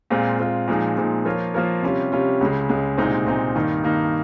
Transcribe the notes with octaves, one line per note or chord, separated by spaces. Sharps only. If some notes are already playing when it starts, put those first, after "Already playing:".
A#2 G#3 C4 F4
A#2 G#3 C4 F4
A#2 F3 G#3 D#4
A#2 F3 G#3 D#4
F3 A#3 F4 A#4 C#5
F3 A#3 F4 A#4 C#5
C3 G3 C#4 F4
C3 G3 C#4 F4
C#2 C#3 G#3
C#2 C#3 G#3
C2 A#2 G#3 C4 D#4
C2 A#2 G#3 C4 D#4
G2 D#3 A#3 D#4
G2 D#3 A#3 D#4